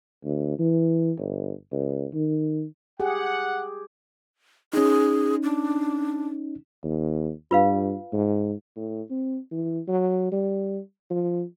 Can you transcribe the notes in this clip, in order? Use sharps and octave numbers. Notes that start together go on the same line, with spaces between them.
D2
E3
G1
C#2
D#3
G4 G#4 F#5
C#4 D#4 G#4
D4
D#2
G2 F4 B4 F5
G#2
A2
C4
E3
F#3
G3
F3